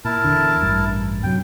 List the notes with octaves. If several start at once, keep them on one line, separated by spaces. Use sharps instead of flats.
A#2 E4 A#4 A5
E1 E2 D3
A1 G2
F#2 C3 F#3 G5